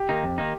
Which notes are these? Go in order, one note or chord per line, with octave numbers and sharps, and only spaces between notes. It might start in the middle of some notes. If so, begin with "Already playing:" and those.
Already playing: G4
D#3 A#3 D#4
F2
D#3 A#3 D#4